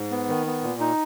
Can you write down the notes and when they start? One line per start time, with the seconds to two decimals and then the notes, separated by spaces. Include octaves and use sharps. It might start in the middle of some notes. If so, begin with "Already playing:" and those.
Already playing: G#2
0.11 B3
0.29 D#3
0.47 B3
0.63 A#2
0.80 D#4